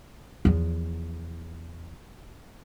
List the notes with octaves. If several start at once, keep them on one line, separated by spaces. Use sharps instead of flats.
E2 F3